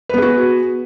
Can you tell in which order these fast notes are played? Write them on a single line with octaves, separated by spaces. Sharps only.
B4 B3 G#4 F#4